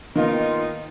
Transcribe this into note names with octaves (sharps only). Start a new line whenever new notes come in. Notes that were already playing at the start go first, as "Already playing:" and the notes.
D#3 A#3 B3 D#4 F4 A#4 D#5 G5